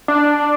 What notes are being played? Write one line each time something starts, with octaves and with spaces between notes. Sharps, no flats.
D4